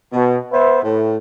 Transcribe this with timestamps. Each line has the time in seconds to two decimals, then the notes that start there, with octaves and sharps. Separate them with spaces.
0.13 B2
0.53 B3 B4 C5 E5
0.83 A2